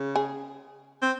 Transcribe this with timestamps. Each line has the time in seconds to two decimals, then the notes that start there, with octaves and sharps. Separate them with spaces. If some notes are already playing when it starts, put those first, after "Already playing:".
Already playing: C#3
0.16 G#4
1.02 C4